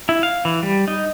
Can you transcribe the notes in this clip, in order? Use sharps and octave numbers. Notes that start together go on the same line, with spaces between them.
E4
F5
E3
G3
D#4